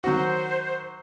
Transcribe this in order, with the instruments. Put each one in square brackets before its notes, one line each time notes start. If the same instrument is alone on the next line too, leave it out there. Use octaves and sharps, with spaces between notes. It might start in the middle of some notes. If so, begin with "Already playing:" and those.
[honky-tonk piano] D#3 F#5 [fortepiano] F#3 F#4 [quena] C5